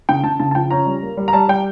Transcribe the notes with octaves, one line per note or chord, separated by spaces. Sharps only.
C#3 G5
C#3 A5
C#3 A5
A5
F3 G5
C#4 A#5
G3
A#3
G3
A#5
G3 A5
G3 G5